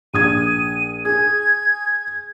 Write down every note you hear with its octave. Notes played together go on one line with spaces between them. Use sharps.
A#1 D#6 G#6 D#7
G#4 G#6